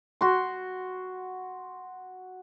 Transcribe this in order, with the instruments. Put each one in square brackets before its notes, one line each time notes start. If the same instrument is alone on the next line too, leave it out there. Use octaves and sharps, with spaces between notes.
[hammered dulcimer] F#4 C6